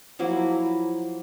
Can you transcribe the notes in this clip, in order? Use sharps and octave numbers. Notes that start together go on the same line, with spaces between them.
F3 F#3 A#3 E4